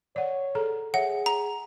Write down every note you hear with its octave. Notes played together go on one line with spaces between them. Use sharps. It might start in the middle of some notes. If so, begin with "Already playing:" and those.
C#5 D5 F#5
G#4 A4 A#5
G#4 C#5 E5 F#5
A#5